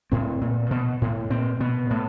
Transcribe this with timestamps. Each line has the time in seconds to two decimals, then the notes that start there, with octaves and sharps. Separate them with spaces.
0.12 A2 C4
0.41 A#2
0.71 B2
1.02 A2
1.30 A#2 C4
1.60 B2 B3
1.90 A2